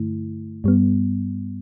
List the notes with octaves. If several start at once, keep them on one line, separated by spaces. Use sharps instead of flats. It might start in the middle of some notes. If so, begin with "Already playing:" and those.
Already playing: G2 D3 A3 E4
G2 G3 B3